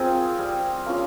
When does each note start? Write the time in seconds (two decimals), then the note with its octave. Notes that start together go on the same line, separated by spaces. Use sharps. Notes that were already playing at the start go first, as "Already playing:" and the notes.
Already playing: C4 F4 G#4 A#4
0.39 G3
0.86 A#3 C#4 F4